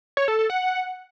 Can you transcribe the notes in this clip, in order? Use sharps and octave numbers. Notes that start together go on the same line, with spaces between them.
C#5
A4
A4
F#5